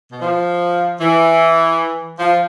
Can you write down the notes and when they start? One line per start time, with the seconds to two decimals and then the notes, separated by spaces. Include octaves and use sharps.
0.11 B2
0.21 F3
1.00 E3
2.19 F3